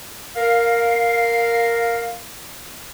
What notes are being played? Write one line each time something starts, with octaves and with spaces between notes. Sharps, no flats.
A#4 F5